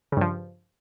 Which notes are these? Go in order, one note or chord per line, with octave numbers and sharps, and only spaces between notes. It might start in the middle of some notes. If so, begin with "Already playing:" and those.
G2 C#3 F3